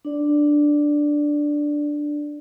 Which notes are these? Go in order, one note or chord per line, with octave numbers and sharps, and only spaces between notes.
D4 D5